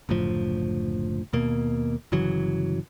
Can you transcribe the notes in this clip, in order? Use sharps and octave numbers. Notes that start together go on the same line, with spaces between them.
F#1 D2 A2 F3
D#2 B2 A#3
G1 C#3 E3 F#3